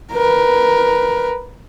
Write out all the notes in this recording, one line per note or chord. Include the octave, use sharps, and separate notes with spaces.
A#4 B4